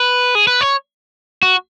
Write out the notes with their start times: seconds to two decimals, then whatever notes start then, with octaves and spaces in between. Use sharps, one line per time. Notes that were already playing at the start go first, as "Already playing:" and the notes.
Already playing: B4
0.35 G#4
0.47 B4
0.61 C#5
1.42 F#4